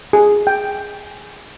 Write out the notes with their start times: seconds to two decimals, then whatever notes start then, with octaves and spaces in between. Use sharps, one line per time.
0.13 G#4
0.47 G5